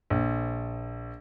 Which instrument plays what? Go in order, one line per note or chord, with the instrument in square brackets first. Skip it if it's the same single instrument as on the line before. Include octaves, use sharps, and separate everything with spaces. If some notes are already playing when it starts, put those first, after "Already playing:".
[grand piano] A#1